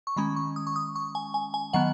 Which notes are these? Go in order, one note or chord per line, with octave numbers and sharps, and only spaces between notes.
C#6
D#3 G#3 C#4 B5
C#6
D#6
C#6
D#6
C#6
G#5
G#5
G#5
D#3 F#3 B3 F#5